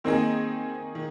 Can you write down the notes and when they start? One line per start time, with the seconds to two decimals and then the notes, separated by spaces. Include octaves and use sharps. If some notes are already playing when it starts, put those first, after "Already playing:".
0.04 D#3 A#3 C4 D#4 G#4
0.95 D#3